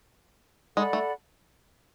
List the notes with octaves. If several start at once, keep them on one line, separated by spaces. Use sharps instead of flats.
G#3 A4 D5 F#5 B5
A3